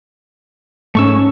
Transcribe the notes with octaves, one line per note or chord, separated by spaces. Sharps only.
G#2 A3 C#4 C#6 E6